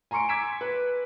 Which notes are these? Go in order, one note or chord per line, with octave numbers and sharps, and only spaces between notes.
G#5 A#5 C6 C#6 C#7 D7
D6 E6 G#6 B6 D7 E7
B4